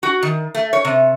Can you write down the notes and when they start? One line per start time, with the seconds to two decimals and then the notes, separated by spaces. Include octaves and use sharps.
0.03 F#4
0.23 D#3
0.55 A3
0.73 C#5
0.85 C3